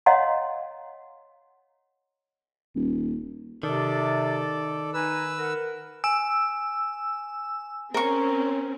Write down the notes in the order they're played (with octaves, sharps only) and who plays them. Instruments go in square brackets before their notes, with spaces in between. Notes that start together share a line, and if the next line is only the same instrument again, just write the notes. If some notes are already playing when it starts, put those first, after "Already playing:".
[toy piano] C#5 D#5 F5 F#5 A#5 C6
[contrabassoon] D#1
[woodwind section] C3 [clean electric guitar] D#3 [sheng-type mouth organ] A4 D5
[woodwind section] D#4 G#5 [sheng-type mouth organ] B4 E6
[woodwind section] A#4 F#5
[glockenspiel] G#5 [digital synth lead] E6
[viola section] C4 C#4 [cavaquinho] A#4 C#6